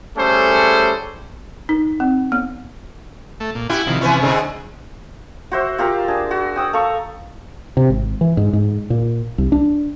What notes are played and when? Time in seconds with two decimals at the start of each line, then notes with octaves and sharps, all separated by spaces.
0.17 G3 A3 C#4 G#4 A4 C5
1.69 D#4
2.00 C4
2.32 B3
3.40 A3
3.55 A#2
3.70 E4 F#4 G4 G#5
3.87 C3 D#3 F3
4.01 C3 E3 B3 C#4 E4
4.22 G#2 D3 G#4
5.52 F#4 C5 E5
5.78 F4 G4 A#4 E5
6.08 D4 G#4
6.31 F#4
6.56 G5 D#6 E6
6.73 A4 F5 A#5 C#6
7.77 C3
7.90 G#1
8.21 E3
8.37 G#2
8.53 G#2
8.90 A#2
9.38 C2
9.52 D4